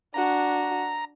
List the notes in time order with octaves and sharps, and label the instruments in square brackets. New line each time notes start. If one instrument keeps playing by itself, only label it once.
[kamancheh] D4 F#4 [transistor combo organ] A#5